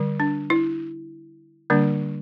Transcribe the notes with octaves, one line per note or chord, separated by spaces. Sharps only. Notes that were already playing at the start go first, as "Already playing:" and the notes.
Already playing: D3 G3
D4
E4
D3 G3 A#3 D4